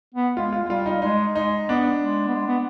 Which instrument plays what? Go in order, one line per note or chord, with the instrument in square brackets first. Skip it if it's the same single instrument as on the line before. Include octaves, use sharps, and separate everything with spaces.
[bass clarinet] B3
[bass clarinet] G#3 [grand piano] F4
[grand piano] F4
[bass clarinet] G#3
[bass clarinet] G3 [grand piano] F4
[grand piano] D#4
[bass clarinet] G#3 [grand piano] D#4
[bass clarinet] G#3 [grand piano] D#4
[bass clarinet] B3 [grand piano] D4
[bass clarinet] G#3
B3
G#3
B3